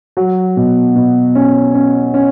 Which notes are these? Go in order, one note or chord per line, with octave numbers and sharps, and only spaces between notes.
F#3
B2
B2
C#4
C#4
C#4